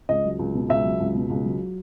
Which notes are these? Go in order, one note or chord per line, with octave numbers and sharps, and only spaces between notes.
C#2 D#5
F#3
C#2
B2
C#2 E5
F#3
C#2
B2
C#2
F#3